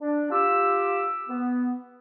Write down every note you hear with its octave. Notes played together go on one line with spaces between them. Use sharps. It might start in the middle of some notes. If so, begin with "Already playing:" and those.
D4
F4 G4 E6
B3